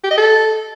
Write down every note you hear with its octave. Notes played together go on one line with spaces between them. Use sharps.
G4
D#5
A4